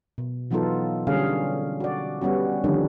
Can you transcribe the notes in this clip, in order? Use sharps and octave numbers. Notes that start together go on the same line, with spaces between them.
B2
E3 F#3 B3 D#4 F4 A4
D3 G3 C#4 G#4 F5
F#4 D5
G3 B3 C#4 F#4
D3 D#3 F3 G3 C#4 D4